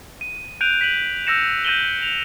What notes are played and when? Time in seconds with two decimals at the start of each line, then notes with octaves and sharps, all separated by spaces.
0.21 D#7
0.61 F#6 G6 D7 D#7 F7
0.81 B6 D#7 F#7
1.27 E6 G6 A#6 C#7 E7
1.65 G6 A#6 D#7 E7 F#7 G7
2.03 F7